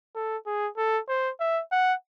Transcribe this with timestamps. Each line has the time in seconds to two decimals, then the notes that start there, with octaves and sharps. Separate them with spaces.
0.15 A4
0.46 G#4
0.77 A4
1.08 C5
1.40 E5
1.72 F#5